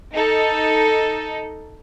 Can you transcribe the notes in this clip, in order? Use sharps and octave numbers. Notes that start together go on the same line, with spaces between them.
D#4 A4